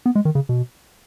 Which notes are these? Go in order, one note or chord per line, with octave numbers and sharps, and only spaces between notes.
B3
G#3
D#3
C#3
B2